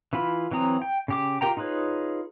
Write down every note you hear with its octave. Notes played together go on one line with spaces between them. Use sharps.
E3 E4 F4 B5
E3 F#3 C4 A#5 D#6
G5
C#3 G4 D6
F4 G4 A#4 G5 A#5
D#4 F4 G#4 B4 C#5